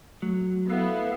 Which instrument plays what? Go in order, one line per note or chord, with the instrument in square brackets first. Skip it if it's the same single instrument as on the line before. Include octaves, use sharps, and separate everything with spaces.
[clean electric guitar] F#3 [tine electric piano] A3
[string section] B3 E4 [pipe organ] A4 B4 F5